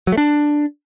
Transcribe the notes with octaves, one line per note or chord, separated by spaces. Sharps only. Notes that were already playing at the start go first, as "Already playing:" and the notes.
F#3
A3
D4